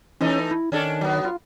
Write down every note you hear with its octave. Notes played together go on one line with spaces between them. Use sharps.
E3 A3 C#4 D#4
E4
D#3 C#4 D4 A4
F#3 B3
F4